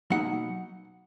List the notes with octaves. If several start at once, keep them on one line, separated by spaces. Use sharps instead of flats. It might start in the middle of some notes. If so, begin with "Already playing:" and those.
B2 F#3 A#3 D#4 F#5